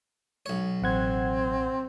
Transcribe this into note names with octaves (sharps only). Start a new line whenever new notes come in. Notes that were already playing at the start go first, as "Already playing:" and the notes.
B1 C#5
A1 C4 F#5 G#6